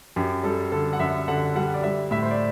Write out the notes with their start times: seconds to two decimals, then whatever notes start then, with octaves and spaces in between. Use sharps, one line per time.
0.16 F#2 G4
0.43 G3 A4
0.72 D3 A4
0.93 F#5
1.00 F#2 E5
1.28 D3 F#5
1.55 G3 F#5
1.74 D5
1.83 G3 E5
2.11 A2 E5
2.22 C5
2.31 D5